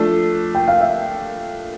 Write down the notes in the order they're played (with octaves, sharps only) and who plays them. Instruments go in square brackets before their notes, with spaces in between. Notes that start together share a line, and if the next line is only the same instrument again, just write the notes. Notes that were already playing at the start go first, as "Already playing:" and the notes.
Already playing: [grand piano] F3 A3 D4 A4
[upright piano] G5
F5
E5